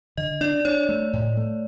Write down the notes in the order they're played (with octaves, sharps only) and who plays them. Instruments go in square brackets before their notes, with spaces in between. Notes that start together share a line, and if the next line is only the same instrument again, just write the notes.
[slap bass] D3 [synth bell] D#5
[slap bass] D4 [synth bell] D5
[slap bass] D4 [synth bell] C#5
[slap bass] A3
A2
A3